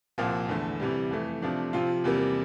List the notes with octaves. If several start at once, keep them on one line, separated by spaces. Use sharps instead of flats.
C2 A#2 F3 C4
E2 D3 A3
C3 E3 G3
F2 E3 A3
C3 F3 A3 D4
C3 F3 C4 F4
E2 C3 G3 A#3